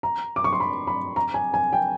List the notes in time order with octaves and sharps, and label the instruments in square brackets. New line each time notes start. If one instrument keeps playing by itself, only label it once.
[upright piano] A#5
D6
C#6
C6
B5
B5
A#5
G#5
G#5
G5